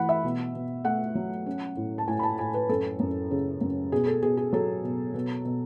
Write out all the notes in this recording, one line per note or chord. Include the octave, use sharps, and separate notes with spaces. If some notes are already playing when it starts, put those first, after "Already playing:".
Already playing: E3 A3 F#5 B5
E5
B2
B2
A3 F#5
F#3
C#4
A2
A5
A2 G#5
B5
A5
A2 G#5
B4
F#2 A4
F#2
C#3
F#2
B2 G#4
A4
B2 G#4
G#4
F#3 A4
B2
B2
B2